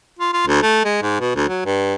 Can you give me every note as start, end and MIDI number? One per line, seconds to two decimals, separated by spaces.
0.19 0.33 65
0.33 0.45 65
0.47 0.60 38
0.62 0.83 57
0.85 0.98 56
1.02 1.19 44
1.20 1.35 47
1.35 1.46 38
1.49 1.64 54
1.65 1.95 43